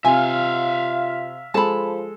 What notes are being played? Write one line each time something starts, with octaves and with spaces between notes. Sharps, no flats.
C3 F4 E5 F5 G#5
F3 G#3 A4 A5 B5